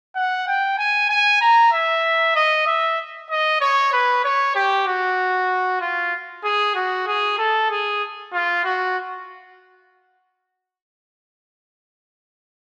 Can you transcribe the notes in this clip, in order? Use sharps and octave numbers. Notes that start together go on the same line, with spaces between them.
F#5
G5
G#5
G#5
A#5
E5
D#5
E5
D#5
C#5
B4
C#5
G4
F#4
F4
G#4
F#4
G#4
A4
G#4
F4
F#4